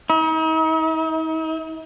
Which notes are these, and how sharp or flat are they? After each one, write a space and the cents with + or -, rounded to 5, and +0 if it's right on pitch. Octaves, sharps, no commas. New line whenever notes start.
D#4 +45